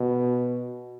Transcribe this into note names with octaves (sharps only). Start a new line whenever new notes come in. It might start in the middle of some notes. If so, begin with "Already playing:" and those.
Already playing: B2